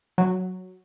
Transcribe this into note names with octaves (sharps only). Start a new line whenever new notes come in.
F#3